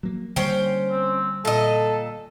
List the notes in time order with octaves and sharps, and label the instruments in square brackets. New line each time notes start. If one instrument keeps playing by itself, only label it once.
[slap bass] F#3 A#3
[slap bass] D3 G3 A#3 [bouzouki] C#4 C5 G5
[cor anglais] C4
[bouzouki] A#2 D#5 [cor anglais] A4